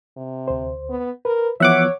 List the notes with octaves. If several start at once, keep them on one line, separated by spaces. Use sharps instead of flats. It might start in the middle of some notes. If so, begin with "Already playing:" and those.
C3
D2 C5
B3
A#4 B4
E3 F3 B3 C#5 E5 F#5 D6